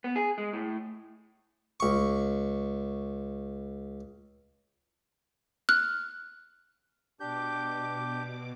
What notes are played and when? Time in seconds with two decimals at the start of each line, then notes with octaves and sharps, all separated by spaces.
0.04 B3
0.16 G#4
0.38 G#3
0.53 A2
1.80 C#2 C#6
5.69 F6 F#6
7.20 B2 D4 G4 D6 G6